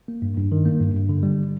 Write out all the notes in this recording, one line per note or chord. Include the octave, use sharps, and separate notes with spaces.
A#3
G2
G2
D#3
A#3
G2
G2
D3
G3